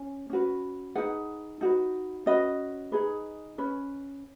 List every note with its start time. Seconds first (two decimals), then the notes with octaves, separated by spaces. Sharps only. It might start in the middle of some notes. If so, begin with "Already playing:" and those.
Already playing: C#4 G#5
0.30 C#4 F#4 B4
0.95 D#4 G#4 B4 F#5
1.61 D#4 F#4 B4
2.26 C#4 F#4 B4 D#5
2.92 D#4 G#4 B4
3.58 C#4 B4